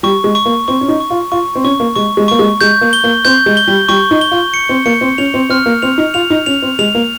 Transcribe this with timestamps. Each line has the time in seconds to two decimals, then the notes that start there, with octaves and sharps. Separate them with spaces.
0.03 G3 C#6
0.24 G#3
0.35 C#6
0.46 A#3
0.68 C4 C#6
0.81 C#4
0.88 D#4
1.00 C#6
1.10 F4
1.32 F4 C#6
1.56 C4
1.64 C#4 C#6
1.80 A#3
1.96 G#3 C#6
2.17 G#3
2.28 A#3 C#6
2.39 G#3
2.61 G#3 G6
2.81 A#3
2.93 G7
3.04 A#3
3.25 C4 G6
3.46 G#3
3.57 G7
3.68 G3
3.89 G3 C#6
4.11 D#4
4.21 G7
4.31 F4
4.54 C#7
4.69 C4
4.86 A#3 C#7
5.01 C4
5.18 C#4 F7
5.34 C4
5.50 C4 F6
5.66 A#3
5.82 C4 F7
5.98 D#4
6.14 F4 F7
6.30 D#4
6.46 C#4 F7
6.62 C4
6.79 G#3 F7
6.95 A#3